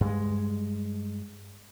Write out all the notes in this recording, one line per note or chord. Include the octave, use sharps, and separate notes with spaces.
G2 G#3